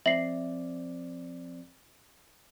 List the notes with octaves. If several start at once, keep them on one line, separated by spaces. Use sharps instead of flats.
F3 C4 D5 E5 C7 F#7